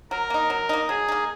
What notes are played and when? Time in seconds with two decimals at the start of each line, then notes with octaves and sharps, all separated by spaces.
0.11 F#3 A#4
0.30 A#3 D#4
0.50 F#3
0.69 A#3 D#4
0.89 F#3 G#4
1.08 A#3 D#4